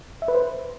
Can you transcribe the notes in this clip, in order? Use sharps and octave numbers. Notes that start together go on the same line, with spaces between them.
E5
B4
C5